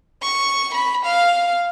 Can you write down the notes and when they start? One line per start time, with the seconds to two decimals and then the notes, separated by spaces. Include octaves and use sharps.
0.22 C#6
0.75 B5
1.06 F5